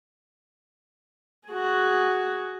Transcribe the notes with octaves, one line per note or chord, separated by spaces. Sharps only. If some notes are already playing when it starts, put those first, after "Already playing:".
F#4 G#4